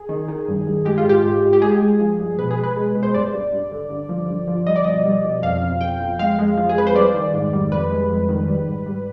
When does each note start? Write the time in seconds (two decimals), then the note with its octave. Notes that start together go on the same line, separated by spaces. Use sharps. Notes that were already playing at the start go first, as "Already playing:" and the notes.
Already playing: G#4
0.09 D#3
0.28 D#3
0.48 G2
0.67 G2
0.85 G#3 G4
0.98 F4
1.04 G#2
1.09 G4
1.24 G#2
1.43 G#3
1.53 G4
1.61 G#3 G#4
1.80 G#3
2.00 F3
2.19 G2
2.38 B2 B4
2.51 G#4
2.57 G#3
2.63 B4
2.77 G#3
2.95 B2
3.03 C5
3.14 G2 D5
3.33 G2
3.52 G2
3.72 D3
3.90 G2
4.09 F3
4.29 G2
4.48 F3
4.66 G3 D#5
4.76 D5
4.84 B2 D#5
5.06 G3
5.25 B2
5.42 F2 F5
5.63 F2
5.81 F2 G5
6.00 F2
6.19 G#3 F5
6.39 G#3
6.57 F3
6.69 G#4
6.76 F2 B4
6.87 C5
6.96 G3 D5
7.14 D#3
7.34 G#2
7.53 G3
7.72 F2 B4
7.90 G#3
8.10 F2
8.29 D#3
8.48 G3
8.67 G#2
8.86 G3